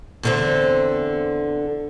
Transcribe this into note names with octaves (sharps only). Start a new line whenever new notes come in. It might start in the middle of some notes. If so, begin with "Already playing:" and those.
E2 D3 C4